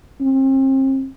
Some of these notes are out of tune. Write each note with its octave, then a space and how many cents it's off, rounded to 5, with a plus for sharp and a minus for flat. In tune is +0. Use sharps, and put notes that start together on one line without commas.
C4 +35